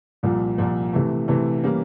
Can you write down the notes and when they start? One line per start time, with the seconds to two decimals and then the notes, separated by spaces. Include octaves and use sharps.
0.23 C2 A#2 F3
0.58 C2 A#2 F3
0.93 C3 E3 A3
1.28 C3 E3 A3
1.63 E3 G3 A#3 C#4